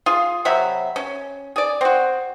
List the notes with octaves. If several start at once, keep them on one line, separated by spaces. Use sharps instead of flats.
F4 G#4
C3 F#3 E5 B5
C#4
G#4 D5
C4 F#4